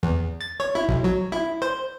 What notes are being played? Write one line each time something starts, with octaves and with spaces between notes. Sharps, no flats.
E2
A6
C#5
E4
B1
F#3
E4
C5